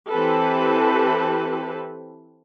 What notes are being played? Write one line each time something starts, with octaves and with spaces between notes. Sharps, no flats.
E3 C4 G4 A4 B4